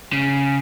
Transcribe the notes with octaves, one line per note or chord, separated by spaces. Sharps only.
C#3